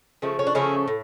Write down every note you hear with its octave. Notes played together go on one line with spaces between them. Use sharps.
C#3 F3 A3
C#4
D4
C#3 F3 A3 C#4 E4
A2